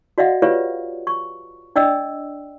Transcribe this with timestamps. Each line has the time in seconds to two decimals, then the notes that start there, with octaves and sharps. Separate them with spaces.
0.18 F#4 D5 D#5 F5 F#5
0.42 F4 G4 B4 C#5 D5 F5
1.07 C#6
1.76 D4 D5 D#5 G5 E6